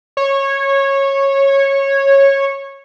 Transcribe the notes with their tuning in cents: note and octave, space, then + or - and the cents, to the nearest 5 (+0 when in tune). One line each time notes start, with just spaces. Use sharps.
C#5 -15